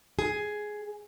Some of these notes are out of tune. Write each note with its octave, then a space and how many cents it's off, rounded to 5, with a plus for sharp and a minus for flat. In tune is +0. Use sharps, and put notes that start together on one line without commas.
G#4 +10